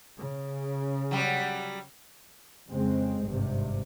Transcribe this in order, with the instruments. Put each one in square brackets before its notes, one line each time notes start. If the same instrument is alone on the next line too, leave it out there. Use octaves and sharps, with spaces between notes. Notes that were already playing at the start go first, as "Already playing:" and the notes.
[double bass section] C#3
[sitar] F#3 G3
[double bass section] F2 C#3 G#3 C4
G#1 G2 C3